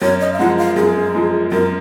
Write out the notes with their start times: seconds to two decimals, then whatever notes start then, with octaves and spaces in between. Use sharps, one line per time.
0.02 F#2 C#5
0.20 D#5
0.33 F5
0.39 F3 G#3 F#5
0.58 F5
0.76 F#2 G#4
1.15 F3 G#3
1.51 F#2 A#4